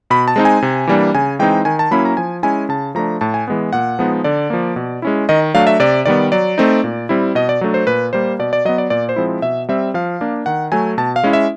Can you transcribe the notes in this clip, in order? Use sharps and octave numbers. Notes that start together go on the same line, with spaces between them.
B2 B5
A5
G#3 C4 D#4
G#5
C3
E3 G3 A#3 D4
C#3 G#5
E3 G#3 C4 D#4 G5
D#3 G#5
A5
F#3 A#3 C#4 E4 B5
A#5
F3 G#5
G#3 C#4 E4 G#5
C#3 A5
F3 A3 D4 A#5
A2 A5
G#5
E3 G#3 B3
A#2 F#5
F3 G#3 B3 D#4
D3 D5
F3 A#3
B2
G#3 C#4 E4
D#3 D#5
F#3 A3 D4 F5
E5
C3 D5
D#3 G3 B3 D5
F#3 D5
A3 C4 D#4
A#2
G3 C4 E4
B2 D#5
D5
F#3 A3 D4
C5
A#2 B4
G3 A#3 C5
B2 D5
D5
F#3 B3 D#5
D5
A#2 D5
C5
F3 G#3 C4 E4
B2 E5
G3 C4 E5
F3 F5
A#3 D4
D#3 F#5
F#3 A3 G#5
B2 A5
F5
G#3 C#4 E4
E5